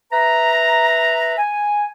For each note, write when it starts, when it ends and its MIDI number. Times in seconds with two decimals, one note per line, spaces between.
0.12 1.33 71
0.12 1.33 76
0.12 1.33 82
1.37 1.88 80